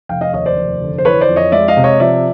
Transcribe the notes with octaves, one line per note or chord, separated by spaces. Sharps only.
F1 F5 G5
D#5 F5
D#2 C#5 D#5
C5 D5
F1
D3
C5
E3 B4 C#5
C5 D5
F2
C#5 D#5
G#3 D5 E5
D#5 F5
C3
C#5 D#5
F3 D5 E5